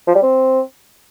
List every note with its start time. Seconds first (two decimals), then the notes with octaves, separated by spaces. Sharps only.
0.07 F3
0.15 G3
0.23 C4